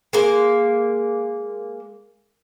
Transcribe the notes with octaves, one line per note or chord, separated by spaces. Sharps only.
G#3 A#3